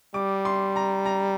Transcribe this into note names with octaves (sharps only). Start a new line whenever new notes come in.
G3 D6
C6
A#5
A#5